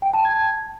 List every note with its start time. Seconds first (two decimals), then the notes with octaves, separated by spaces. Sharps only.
0.02 G5
0.13 A5
0.25 G#6